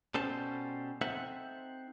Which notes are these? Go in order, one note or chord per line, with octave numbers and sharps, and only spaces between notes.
B2 G3 C#4 A4 C5 A5
C4 D#4 A4 C5 E5 F#5